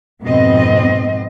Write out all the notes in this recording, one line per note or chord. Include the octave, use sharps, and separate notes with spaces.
F2 G#2 B2 B3 C4 D#5